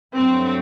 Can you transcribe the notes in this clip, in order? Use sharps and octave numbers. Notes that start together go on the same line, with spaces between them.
G2 F#3 A3 C4